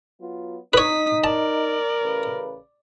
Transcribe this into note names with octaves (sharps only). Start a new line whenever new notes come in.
F#3 B3 F4
D#4 B4 C#5 D#6 B6
A#4 D5 A5
A1 C#3 B4